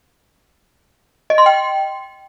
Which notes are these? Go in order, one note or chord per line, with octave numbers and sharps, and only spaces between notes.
D#5
C6
G5